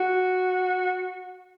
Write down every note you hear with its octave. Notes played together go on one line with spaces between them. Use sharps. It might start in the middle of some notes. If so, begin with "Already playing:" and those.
Already playing: F#4